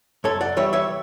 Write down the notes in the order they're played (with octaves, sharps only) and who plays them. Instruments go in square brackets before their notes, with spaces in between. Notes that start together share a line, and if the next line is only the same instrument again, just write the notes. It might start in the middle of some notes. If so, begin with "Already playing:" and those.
[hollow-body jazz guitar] F#2 A4 C#5
D5 F#5
E3 G3 C#5 E5
C#5 E5